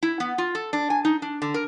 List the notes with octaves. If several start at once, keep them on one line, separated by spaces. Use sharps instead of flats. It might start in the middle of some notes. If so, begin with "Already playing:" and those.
E4
B3
F4
A4
D4
G#5
D#4
D4
D3
A#4